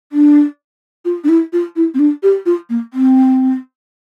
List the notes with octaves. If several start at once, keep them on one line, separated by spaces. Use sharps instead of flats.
D4
F4
D4
E4
F4
E4
C4
D4
G4
F4
A#3
C4